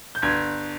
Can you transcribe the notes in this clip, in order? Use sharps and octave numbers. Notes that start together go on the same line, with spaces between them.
G6
G1 G#6